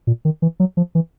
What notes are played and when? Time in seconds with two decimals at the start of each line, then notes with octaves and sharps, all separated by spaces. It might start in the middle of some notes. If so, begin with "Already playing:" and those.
0.07 A#2
0.25 D#3
0.42 E3
0.60 F#3
0.77 F3
0.95 E3